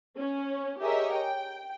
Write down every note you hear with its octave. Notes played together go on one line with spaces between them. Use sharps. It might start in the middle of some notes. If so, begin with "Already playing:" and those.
C#4
G4 G#4 A#4 C#5 D#5 E5
G5